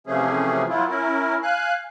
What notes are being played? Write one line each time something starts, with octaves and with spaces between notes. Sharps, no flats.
C3 E3 F3 A3 C#4 G#4
F#3 B3 E4 F4
C#4 E4 A#4
F5 G#5 F#6